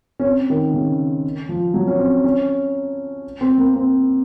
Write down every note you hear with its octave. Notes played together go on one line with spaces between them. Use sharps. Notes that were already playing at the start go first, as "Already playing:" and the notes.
C#4
C4
D#3
C#3
F3
F#3
C#4
C4
C#4
C4
A#3
C4